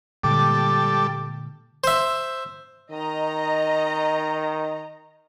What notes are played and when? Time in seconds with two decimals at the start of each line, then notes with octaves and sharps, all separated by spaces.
0.23 A#2 D3 G3 G#3 A4 D6
1.84 C5 E5
2.91 D#3 D#5 A#5